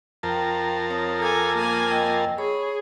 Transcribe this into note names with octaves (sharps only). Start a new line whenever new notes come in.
F2 A#4 G5 A5 A#5
C4 C#5 D#6
A4 G#5 A#5 D6
A#3 G#5
D#5 G5 E6
G#4 C#5 B5 C#6